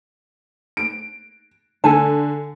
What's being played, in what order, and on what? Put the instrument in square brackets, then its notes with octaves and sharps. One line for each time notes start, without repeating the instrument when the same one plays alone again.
[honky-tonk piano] D7
[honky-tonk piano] D3 [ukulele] A4 G#5 A5